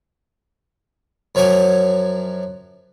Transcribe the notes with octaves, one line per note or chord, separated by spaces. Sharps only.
F#2 F3 F#3 C#5 G#5 D6